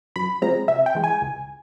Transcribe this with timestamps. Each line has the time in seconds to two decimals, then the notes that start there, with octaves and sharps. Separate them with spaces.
0.16 F#2 B5
0.42 C#3 F3 G#3 C4 A#5
0.68 C3 E5
0.86 G5
0.95 E3 G#3
1.04 G#5
1.22 C#2